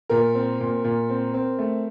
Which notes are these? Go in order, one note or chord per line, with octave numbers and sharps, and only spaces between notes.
A#2 A#4
C4
A#2
A#2
C4
C4
A3